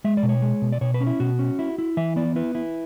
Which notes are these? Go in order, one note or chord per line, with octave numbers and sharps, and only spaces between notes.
G#3 E5
D5
B2
C#5
G#3
B2
D5
B2 C#5
B4
C#4
E4
B2 F#4
C#4
E4
E4
E3 E5
B3 D5
E4 B4
E4